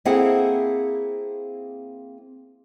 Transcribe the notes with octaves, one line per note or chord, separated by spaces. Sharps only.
A#3 C4 E4 G#4 A4 F#5